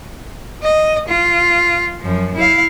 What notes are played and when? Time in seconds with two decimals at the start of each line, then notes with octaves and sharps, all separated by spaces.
0.63 D#5
1.08 F4
2.00 F#2 F3
2.36 E4 F5